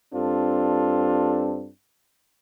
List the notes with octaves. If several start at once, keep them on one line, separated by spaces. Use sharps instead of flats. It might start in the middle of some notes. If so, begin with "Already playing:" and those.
G2 C4 D4 F4 A4